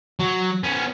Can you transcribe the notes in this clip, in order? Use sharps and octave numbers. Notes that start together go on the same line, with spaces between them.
F#3
B3 C#4